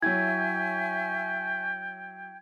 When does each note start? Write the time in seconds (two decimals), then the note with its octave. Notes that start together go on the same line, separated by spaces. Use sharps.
0.02 F#3 E4 E5 G5 G#5 C#6 G#6